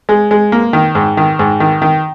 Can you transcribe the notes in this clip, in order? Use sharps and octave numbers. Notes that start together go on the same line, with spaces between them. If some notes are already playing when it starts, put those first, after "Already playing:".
G#3
G#3
A#3
D#3
G#2
D#3
G#2
D#3
D#3